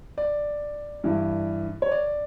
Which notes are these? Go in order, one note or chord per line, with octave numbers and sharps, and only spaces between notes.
D5
G2 E3
C#5
D5